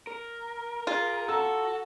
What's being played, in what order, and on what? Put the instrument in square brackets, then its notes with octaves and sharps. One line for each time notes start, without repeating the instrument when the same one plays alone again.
[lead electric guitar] A#4
[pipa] F4 [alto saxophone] G#4
[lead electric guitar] F#4 [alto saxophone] A4 [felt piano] A#5 E6